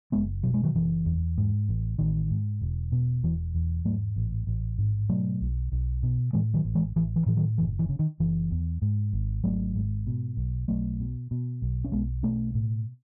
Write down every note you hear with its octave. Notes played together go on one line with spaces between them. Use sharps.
F#1 G#3 B3
B2 F#3
G#3
D#3 F#3
F#1 E3
E2
G#2
A1
A1 D#3
G#2
E1
B2
E1 E3
E2
G#2 F#3 A3
A1
A1
G#2
B2 F#3 A3
B1
B1
B2
A2 E3 G#3
D#3 F#3
A1
E3 G#3
A1 E3
E3
A2 E3
D#3 F#3
F#1 E3
E3
C#3
D#3
F#1 E3
E2
G#2
G#1
G#1 F#3 A3
G#2
B2
B1
B1 F#3 A3
B2
B2
B1
C#4
B1 G#3 B3
B2 A3 C#4
A2